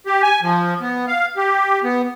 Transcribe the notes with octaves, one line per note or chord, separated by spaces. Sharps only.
G4
G#5
F3
B3
F5
G4
B3